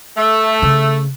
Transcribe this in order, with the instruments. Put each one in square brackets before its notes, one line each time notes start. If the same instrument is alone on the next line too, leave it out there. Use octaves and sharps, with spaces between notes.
[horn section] A3 [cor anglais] E5
[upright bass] C#3